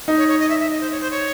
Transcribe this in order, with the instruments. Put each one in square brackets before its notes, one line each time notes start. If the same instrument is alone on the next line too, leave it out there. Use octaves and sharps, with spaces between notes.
[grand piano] D#4
[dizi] C#5
C#5
D#5
E5
E5
D#5
C5
C#5
C5
C#5